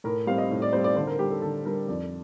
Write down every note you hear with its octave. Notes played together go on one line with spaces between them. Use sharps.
A2 A#4
G3 C4 F5
D#5
A2
D5
G3 C4 C5
D5
D3 C5
A#4
G3 D4 G4
A4
D3 A4
G3 D4 A#4
F2 D5